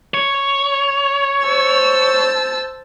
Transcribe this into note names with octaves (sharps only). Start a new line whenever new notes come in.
C#5
C5 A5 E6